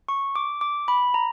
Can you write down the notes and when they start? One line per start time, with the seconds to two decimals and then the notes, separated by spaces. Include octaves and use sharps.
0.09 C#6
0.36 D6
0.61 D6
0.88 B5
1.14 A#5